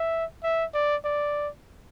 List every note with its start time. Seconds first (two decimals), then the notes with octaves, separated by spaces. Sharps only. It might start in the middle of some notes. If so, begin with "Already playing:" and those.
Already playing: E5
0.43 E5
0.74 D5
1.05 D5